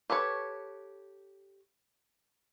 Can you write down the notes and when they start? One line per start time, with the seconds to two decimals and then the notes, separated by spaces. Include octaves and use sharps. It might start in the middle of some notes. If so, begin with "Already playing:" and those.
0.10 G4 A4 B4 C#5